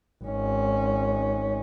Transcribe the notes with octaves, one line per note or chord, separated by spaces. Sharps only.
G#1 C#4